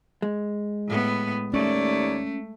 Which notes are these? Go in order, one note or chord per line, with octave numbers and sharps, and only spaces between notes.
G#3
A2 B3
D#2 A3 C#4 C#5 D5